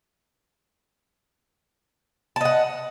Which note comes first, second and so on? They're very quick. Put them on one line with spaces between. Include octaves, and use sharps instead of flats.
A5 D#5 F#5